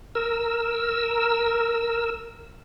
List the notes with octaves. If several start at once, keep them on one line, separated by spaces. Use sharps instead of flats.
A#4 E6